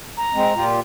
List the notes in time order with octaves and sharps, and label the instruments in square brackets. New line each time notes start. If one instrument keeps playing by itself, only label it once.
[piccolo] A#5
[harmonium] G#3 C4
A#2 F4 G4